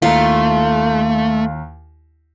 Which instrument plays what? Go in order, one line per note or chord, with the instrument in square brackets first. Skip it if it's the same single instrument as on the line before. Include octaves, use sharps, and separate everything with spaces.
[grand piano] D#2 A#5 [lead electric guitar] A3 [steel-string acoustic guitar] F4